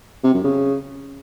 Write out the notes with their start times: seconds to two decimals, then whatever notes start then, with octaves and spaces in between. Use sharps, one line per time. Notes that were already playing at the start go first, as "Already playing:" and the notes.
0.24 C3
0.34 F#2
0.44 C#3